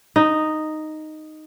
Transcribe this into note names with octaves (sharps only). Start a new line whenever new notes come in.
D#4